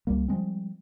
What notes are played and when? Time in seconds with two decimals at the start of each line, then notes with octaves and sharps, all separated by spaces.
0.07 C#2 G3 A#3
0.28 F3 G3 G#3 C4